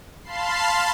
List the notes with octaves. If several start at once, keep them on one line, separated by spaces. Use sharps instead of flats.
F5 A5 B5 C6 C7